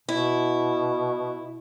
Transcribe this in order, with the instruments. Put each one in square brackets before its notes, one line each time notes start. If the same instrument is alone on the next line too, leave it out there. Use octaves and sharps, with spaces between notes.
[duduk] B2 [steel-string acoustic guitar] E4